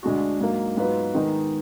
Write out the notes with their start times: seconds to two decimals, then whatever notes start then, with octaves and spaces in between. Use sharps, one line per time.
0.03 D2 D3 G#3 D4 F#4
0.41 G#2 F#3 A#3
0.77 G#2 F#3 B3 F4 B4
1.15 D#3 G#3 B3 D#4